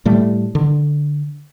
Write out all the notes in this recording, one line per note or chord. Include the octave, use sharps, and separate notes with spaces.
A2 G3 A3
D3